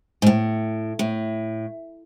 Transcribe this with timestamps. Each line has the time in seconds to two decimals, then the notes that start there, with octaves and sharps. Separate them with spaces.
0.22 G#2
0.27 A2
0.99 A2